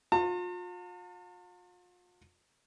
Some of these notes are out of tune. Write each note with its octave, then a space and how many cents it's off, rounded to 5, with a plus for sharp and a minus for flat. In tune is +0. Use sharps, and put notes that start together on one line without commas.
F4 +40 A5 +45